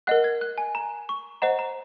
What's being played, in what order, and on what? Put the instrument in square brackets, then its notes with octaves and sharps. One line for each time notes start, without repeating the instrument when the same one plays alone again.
[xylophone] A#4 D#5 F#5 F#6
G#6
F#6
G#5
A#5
C#6
C5 D#5 F#5 A#5
A#5